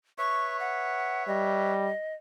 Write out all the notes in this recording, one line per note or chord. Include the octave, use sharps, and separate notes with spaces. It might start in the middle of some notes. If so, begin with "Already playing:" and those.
B4 C#5 E5 C#6
F#5
G3 D#5